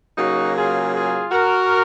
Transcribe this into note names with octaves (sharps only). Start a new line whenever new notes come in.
C#3 F#3 A#3 D#4 F#4
F4 G#4
F4 G#4
F#4 A#4